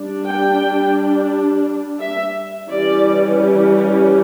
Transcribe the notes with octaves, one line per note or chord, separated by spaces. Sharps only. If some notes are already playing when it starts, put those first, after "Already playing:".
Already playing: G3 D4
G5
E5
E3 G3 C#4 D5